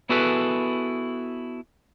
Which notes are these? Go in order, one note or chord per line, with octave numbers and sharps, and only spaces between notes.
B3 E4 F#4 G#4 A4 B4